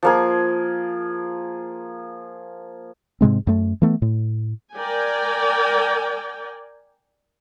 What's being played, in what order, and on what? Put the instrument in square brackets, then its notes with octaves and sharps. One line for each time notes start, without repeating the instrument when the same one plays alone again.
[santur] F3 A#3 G#4
[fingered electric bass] G#2 C3 G#3 C4
F#2 A3
E3 A3 B3
A2
[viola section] A#4 D5 G5 G#5